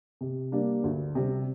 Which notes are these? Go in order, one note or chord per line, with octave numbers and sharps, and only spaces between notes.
C3
G3 A#3 D4
D2
C3 G3 C4